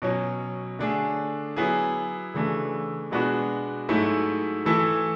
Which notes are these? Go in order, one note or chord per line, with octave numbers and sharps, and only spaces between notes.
B2 F#3 C#4
D3 A3 D4 G#4
F#3 B3 E4 G#4
C#3 E3 A3 D4
B2 G#3 B3 D4 F#4
G#2 F#3 A3 E4
E3 A3 E4 A4